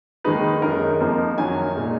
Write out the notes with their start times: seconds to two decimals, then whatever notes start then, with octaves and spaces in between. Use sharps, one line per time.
0.24 D#2 D#3 G#3 D#4 B4
0.62 F#2 D#3 G#3 D#4 A#4
1.00 F2 F3 A#3 D#4
1.38 F#2 D#3 F#3 G#5
1.75 A#2 G#3 D#4